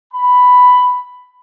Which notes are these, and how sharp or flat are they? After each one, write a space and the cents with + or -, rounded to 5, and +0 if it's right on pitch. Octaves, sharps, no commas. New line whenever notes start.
B5 +5